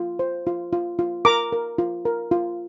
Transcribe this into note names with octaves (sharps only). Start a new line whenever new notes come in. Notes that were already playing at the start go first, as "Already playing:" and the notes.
Already playing: F4
C5
F4
F4
F4
A#4 A#5 D6
A#4
F4
A#4
F4